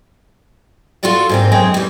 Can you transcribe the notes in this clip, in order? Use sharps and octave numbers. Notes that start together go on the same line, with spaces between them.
F4 F#4 A4 D5 F5
G#2 A#3 C4
F#2 G#3 C4 C#5 G5
E3 G3